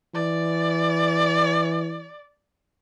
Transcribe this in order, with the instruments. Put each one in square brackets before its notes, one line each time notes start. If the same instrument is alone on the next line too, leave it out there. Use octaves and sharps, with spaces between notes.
[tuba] E3 [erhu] D5